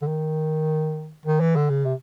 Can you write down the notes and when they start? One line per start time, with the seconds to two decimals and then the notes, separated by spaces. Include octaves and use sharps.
0.02 D3
0.07 D#3
1.26 D#3
1.40 E3
1.56 D3
1.70 C#3
1.85 C3